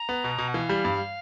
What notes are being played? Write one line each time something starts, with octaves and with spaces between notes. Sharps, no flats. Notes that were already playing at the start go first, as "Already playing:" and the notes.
Already playing: A#5
B3
B2
B2
F#5
E3 F5
G3
G2